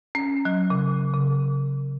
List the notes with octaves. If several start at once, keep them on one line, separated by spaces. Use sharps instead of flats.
C#4
F#3
C#3
C#3